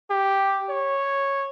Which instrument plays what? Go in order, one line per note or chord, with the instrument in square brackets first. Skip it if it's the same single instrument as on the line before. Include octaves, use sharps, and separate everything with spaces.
[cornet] G4
C#5